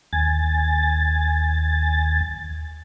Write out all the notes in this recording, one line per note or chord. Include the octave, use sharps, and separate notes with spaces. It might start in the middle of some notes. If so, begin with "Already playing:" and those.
D#2 G#5 A6